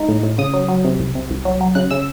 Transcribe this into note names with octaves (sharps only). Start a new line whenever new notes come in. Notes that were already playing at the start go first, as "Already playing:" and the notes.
Already playing: G#3 D#4
A2
A2
C#3 D#6
F#3
F#3
C3
C2
C3
C2
F#3
F#3
C#3 F#6
C#3 E6